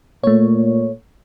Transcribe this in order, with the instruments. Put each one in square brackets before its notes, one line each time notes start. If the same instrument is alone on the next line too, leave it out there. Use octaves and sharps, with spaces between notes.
[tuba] A#2 [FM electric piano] A3 C#5